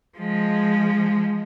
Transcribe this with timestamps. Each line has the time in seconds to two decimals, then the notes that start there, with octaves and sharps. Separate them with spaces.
0.19 F3 G#3